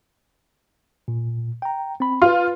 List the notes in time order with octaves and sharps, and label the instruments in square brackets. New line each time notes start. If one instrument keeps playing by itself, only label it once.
[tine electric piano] A#2
G5 A#5
C4 B5
[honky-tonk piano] F4 [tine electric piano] B4 C6